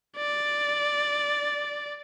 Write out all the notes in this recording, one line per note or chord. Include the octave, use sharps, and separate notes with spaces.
D5